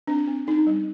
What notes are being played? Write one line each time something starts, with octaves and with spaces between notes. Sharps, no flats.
C4 D4
C4
C4 D#4
G3